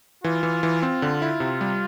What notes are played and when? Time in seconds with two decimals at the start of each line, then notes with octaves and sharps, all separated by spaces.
0.24 E3 F4
0.43 E3
0.63 E3
0.82 C4 F4
1.02 D3
1.22 E4
1.40 C3
1.61 G3